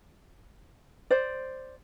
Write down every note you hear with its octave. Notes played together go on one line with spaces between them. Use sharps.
C5 D5